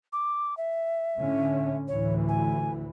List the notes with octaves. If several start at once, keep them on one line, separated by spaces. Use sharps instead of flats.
D6
E5
A2 D3 C#4
D2 A2 E3 C#5
G#5